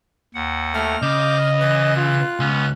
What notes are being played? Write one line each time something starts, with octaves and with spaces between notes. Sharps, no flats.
D#2 F#5
A3 F6
C#3 D#5 D6 G6
E3 F#6
F4
C#2 B3 C#4